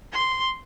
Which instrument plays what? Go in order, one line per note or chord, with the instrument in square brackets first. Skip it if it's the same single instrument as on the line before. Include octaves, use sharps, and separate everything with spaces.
[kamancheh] C6